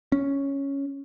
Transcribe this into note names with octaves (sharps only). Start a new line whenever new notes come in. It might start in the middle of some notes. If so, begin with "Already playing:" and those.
C#4